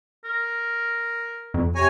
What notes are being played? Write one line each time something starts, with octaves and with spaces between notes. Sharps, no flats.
A#4
F2
C3 C#5 G#5 A#5